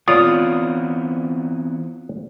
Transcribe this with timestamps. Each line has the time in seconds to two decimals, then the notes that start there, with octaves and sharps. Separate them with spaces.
0.08 E3 B3 C4 F4 C#5 D5 D#6